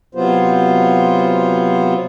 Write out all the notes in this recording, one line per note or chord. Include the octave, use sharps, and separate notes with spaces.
C3 F#3 B3 F4 C5